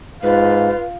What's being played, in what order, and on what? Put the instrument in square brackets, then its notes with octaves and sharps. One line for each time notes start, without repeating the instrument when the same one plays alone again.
[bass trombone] G#2 [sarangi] F4 [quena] B4